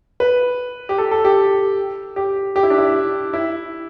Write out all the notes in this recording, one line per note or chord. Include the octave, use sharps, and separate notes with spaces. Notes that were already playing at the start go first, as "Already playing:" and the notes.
B4
G4
A4
A4
G4
G4
G4
E4
D4
E4
E4